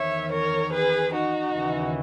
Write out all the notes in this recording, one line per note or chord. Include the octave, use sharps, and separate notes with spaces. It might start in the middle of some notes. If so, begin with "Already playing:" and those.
Already playing: E2 D#3 C#5 E5
A#4 C#5
G#4 B4
D#4 F#4
D#2 C#3 E3